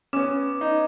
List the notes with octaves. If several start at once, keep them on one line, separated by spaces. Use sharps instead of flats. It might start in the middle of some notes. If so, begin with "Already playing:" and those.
B3 C#4 C#5 D6
D#4